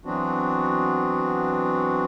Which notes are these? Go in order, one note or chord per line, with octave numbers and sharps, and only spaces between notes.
E3 F#3 B3 C4 D4 F#4